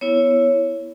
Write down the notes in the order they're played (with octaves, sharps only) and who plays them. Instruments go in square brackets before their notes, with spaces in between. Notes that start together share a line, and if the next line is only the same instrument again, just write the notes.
[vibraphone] B3 E4 C#5